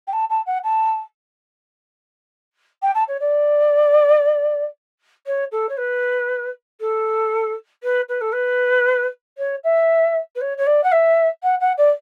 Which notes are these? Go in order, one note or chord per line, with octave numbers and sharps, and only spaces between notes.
G5
A5
A5
F#5
A5
G5
A5
C#5
D5
C#5
A4
C#5
B4
A4
B4
B4
A4
B4
C#5
E5
B4
C#5
C#5
D5
F#5
E5
F#5
F#5
D5